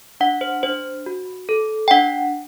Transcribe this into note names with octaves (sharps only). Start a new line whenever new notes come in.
D4 F#5
C5
D4 C5
F#4
A4
G5
D4 F#5